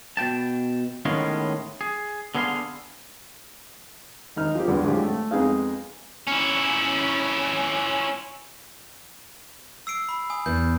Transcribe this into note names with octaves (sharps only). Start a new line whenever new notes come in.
B2 G5 A5
A2 D#3 G#3 B3 C#4 F5
G#4
D3 B3 G#4 A#4 F5 C6
D#2 D#4 F6
F3 G4
E2 G2 D3
A2 D3 F3 G#3 F4 G4
A3
F2 G#3 B3 D#4 G#4 F5
C#4 E4
E6 C7 D7
B5
G#5 D#6
E2 G6